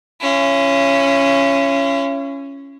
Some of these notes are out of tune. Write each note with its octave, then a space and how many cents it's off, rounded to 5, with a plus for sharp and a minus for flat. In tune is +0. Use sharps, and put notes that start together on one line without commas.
C#4 +0 E4 +45